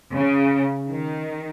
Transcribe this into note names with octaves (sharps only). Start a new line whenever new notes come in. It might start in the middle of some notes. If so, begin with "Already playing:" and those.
C#3
D#3